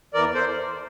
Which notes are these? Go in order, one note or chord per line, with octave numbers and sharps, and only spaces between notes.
E2 E3 A#4 D5
A4 C5